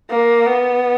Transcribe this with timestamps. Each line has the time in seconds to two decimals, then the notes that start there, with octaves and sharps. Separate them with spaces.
0.10 A#3
0.47 B3